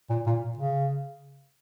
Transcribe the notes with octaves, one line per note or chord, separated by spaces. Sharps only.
A#2
A#2
C#3